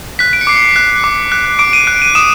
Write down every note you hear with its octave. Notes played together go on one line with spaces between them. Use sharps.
F#6 B6
D7
C#7
D6 C7
C#7
F#6
D6
F#6
D6 D7
D#7
F#6 D7
D#7
D#6 E7